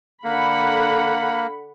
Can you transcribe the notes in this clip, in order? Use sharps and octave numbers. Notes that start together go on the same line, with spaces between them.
D3 A#3 F#5 B5